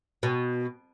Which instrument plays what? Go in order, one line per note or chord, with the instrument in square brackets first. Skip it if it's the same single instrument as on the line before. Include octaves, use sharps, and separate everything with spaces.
[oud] B2